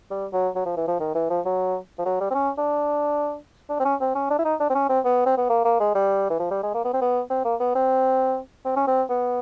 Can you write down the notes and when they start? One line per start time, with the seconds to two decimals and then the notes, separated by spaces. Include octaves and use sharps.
0.11 G3
0.33 F#3
0.56 F#3
0.66 F3
0.77 E3
0.88 F3
1.00 D#3
1.15 E3
1.30 F3
1.46 F#3
1.99 F3
2.06 F#3
2.20 G3
2.31 C4
2.34 C#4
2.58 D4
3.69 D4
3.80 C4
3.85 C#4
4.01 C4
4.15 C#4
4.30 D4
4.39 E4
4.45 D#4
4.60 D4
4.70 C4
4.75 C#4
4.89 C4
5.05 B3
5.26 C4
5.37 B3
5.49 A#3
5.65 A#3
5.80 G#3
5.95 G3
6.30 E3
6.39 F3
6.51 G3
6.63 G#3
6.74 A#3
6.84 B3
6.93 C4
7.01 B3
7.30 C4
7.45 A#3
7.60 B3
7.75 C4
8.65 C4
8.76 C#4
8.87 C4
9.10 B3